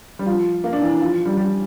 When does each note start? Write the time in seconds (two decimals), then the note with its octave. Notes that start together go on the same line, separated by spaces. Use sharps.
0.19 G3
0.26 F3
0.64 A#3
0.73 D4
0.82 E3
1.01 F3
1.26 G3
1.37 G3